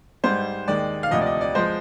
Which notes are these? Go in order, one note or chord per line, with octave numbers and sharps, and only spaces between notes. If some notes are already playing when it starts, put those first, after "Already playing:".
G#2 G3 C5
D#2 D#3 G#3 D5
F5
D2 C3 F3 D#5
D5
D#5
D5
F3 G#3 C5